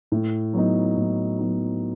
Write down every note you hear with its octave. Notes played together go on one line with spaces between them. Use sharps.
A2
F#3 B3 D#4
A2
F#3 B3 D#4